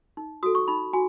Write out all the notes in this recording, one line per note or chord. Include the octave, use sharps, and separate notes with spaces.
D#4
F#4 A4 D#6
C#6
D#4 B5
F#4 G#5